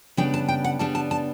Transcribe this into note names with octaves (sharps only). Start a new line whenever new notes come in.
C#3 G3 B3 D4 G5
A5
G5
F#5
C#3 G3 B3 D4 A5
A5
A5